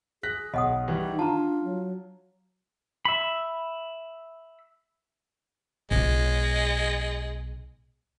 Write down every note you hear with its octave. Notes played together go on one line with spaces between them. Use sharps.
G#4 F#6 A#6 B6
B1 D#5 F#5 D#6
D#3 E3 G3
D#4
D4 F4 A5 A#5
F#3
E5 B5
B1 G#3 F4